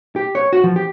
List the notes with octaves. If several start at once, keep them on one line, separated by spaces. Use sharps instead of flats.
G4
C#5
F#4
F3
G4